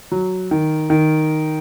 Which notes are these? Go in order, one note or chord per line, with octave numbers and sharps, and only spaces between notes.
F#3
D#3
D#3